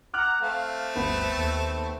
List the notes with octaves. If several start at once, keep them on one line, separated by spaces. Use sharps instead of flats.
F#5 A#5 D6 F6 F#6
A3 C4 A4 F5
G1 D2 B3
D#2